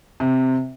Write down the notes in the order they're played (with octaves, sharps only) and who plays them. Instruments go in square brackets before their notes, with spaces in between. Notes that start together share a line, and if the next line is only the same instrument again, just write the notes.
[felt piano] C3